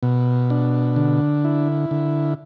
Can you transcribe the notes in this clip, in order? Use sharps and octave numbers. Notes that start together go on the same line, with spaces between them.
B2
D4
D3
E4
D3